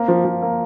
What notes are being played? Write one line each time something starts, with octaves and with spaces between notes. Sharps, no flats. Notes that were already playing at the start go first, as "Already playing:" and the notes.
Already playing: A#3 C4
F3
F3
A#3